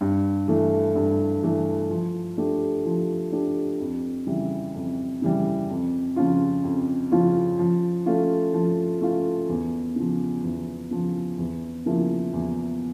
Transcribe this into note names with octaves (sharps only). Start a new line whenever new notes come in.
G2
E3 A3
G2
E3 A3
F3
A3 D4 G4
F3
A3 D4 G4
F2
C#3 E3 G3
F2
C#3 E3 G3
F2
C#3 F3 C#4 F4
F2
C#3 F3 C#4 F4
F3
A3 C#4 F4
F3
A3 C#4 F4
E2
C#3 F3
E2
C#3 F3
E2
C#3 F3 A#3 E4
E2